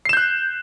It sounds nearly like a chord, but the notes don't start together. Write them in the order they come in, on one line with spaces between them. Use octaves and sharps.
C7 E7 G6 F#6